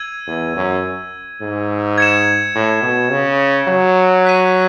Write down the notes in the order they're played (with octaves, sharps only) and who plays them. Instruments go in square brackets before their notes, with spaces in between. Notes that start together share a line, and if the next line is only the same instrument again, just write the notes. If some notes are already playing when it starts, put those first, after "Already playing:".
Already playing: [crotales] E6 G#6 D#7
[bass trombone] E2
F#2
G#2
[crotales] G#6 C#7 E7
[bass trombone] A2
B2
C#3
F#3
[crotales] F#6 B6 D#7